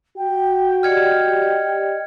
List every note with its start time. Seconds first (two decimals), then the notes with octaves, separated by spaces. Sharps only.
0.17 F#4 G5
0.83 G4 D5 D#5 G5 F6 G#6 C#7